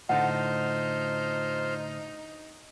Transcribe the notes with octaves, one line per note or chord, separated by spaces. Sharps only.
A2 D3 D#4 F4 C5 F#5